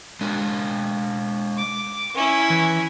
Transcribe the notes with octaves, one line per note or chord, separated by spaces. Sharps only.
G#3 D4 A#4
D6
C#4 E4
E3